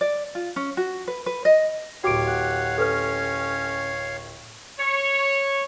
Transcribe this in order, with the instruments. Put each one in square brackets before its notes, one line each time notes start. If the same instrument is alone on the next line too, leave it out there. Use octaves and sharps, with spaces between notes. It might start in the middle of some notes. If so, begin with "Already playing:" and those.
[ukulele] D5
F4
C#4
F#4
B4
B4
D#5
[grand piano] D1 G4 [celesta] F#4 D6 D7 [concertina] C#5 F5
[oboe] F#5
[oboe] C#4 [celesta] A4 B4 F6
[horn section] C#5